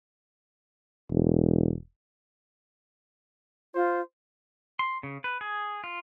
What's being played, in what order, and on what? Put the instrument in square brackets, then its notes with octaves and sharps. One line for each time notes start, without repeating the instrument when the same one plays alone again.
[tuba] E1
[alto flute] F4 [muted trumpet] C5
[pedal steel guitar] C6
C#3
B4
G#4
F4